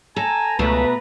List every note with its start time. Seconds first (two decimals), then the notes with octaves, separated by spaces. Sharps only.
0.16 A4 G#5 A#5
0.59 C#2 B2 A3 A4 B4 A#5 B5